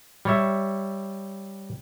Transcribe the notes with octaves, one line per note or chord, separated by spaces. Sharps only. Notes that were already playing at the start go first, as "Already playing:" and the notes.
G3 C#5 E5